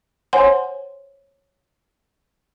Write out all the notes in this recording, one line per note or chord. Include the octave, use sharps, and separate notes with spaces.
C5 C#5 F#5 G#5 C6